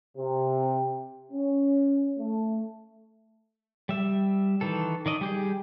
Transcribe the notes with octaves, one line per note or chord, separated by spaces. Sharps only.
C3
C#4
A3
G3 E5
D#3 E3 A4
D#3 D5 D#5
G3 G4 G#4